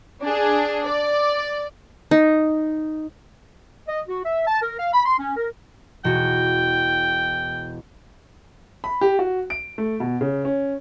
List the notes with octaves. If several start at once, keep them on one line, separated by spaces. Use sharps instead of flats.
D4 G#4
D5
D#4
D#5
F#4
E5
A5
A#4
F5
B5
C6
C#4
A#4
E1 F#4 G5
B5
G4
F#4
D7
A3
B2
C#3
C#4